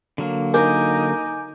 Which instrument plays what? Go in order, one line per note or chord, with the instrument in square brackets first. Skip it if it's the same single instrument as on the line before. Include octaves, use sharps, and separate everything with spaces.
[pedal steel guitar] D3 F#3 A#3
[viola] D#4 [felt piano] A#4 [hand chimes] G#5 D6 G6